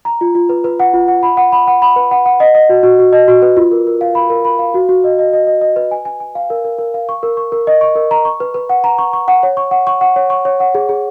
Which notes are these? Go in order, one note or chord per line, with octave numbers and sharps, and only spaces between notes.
A#5
F4
F4
B4
B4
F#5
F4
F#5
B5
F#5
B5
F#5
B5
B4
F#5
F#5
D#5
D#5
F#4
F#4
F#4
D#5
F#4
B4
F4
A#4
A#4
F5
B5
A#4
B5
F5
F#4
F#4
D#5
D#5
D#5
D#5
D#5
B4
G#5
G#5
G#5
F5
A#4
A#4
A#4
F5
C#6
A#4
C#6
A#4
D#5
C#6
A#4
A#5
C#6
B4
B4
F#5
A#5
C#6
C#6
F#5
C#5
C#6
F#5
C#6
F#5
C#5
C#6
C#5
F#5
G#4
G#4